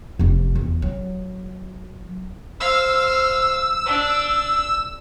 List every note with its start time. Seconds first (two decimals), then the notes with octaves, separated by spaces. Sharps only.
0.19 F1 F2
0.55 E2
0.82 F#3
2.60 C5 F5 E6
3.86 D4